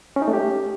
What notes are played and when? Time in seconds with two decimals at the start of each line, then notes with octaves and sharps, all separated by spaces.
0.16 C#4
0.22 D#4
0.28 A3
0.33 G4